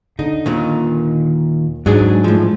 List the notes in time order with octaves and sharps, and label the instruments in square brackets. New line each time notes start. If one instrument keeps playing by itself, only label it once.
[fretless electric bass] D3 [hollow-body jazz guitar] D#4
[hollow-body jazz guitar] D#2 A#2 D#3
[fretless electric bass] G#2 [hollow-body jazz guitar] F#3 D4 G#4
[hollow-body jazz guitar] A2 F3